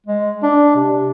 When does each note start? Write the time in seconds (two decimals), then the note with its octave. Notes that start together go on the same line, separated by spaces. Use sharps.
0.07 G#3
0.43 D4
0.75 C3